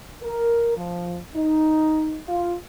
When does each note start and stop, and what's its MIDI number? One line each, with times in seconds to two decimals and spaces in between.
0.23 0.73 70
0.77 1.18 53
1.35 2.19 63
2.28 2.54 65